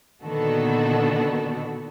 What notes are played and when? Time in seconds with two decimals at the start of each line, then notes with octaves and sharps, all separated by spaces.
0.24 A#2 D3 D#3 B3 F#4 A4